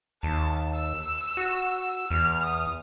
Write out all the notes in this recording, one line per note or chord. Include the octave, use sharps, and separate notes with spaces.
D#2 A5
E6
F#4
E2 F6
D#6